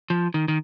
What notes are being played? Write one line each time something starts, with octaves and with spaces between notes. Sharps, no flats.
F3
D#3
D#3